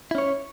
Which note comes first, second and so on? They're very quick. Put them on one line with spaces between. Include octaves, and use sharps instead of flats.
E4 C#4 C#5